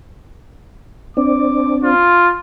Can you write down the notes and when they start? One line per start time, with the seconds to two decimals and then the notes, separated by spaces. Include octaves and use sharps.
1.17 C4 D4 D6
1.83 F4